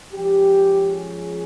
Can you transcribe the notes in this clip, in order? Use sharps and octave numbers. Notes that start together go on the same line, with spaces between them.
F3 G#3 C#4 G4
G#4